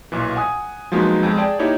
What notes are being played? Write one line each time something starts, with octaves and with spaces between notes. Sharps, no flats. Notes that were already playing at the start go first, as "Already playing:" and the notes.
B1 A#2 E3
F#5 G#5 D#6
F3 F#3 G#3 A#3 B3 D#4
F2 G#3
G#4 D5 G5 A5
A#3 D#4 E4 G4 C#5